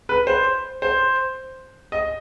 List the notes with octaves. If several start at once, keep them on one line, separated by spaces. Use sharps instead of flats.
B4
C5
C5
D#5